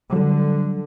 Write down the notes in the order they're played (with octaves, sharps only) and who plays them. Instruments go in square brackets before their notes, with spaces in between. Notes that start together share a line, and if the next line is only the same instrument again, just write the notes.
[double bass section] D3 [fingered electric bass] F#3 G3